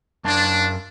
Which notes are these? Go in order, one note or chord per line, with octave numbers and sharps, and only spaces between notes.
F#2 D4 A5